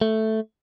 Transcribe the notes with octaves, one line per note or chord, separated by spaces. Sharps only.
A3